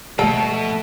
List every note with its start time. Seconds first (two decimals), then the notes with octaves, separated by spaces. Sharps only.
0.19 B2 E3 F3 A3 A4